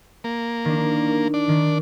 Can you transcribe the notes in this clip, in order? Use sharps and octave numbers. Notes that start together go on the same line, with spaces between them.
A#3
D#3 D4
D4
D#3